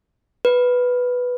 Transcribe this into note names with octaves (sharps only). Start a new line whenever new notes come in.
B4